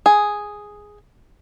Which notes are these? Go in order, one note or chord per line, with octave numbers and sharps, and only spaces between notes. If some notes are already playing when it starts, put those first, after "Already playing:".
G#4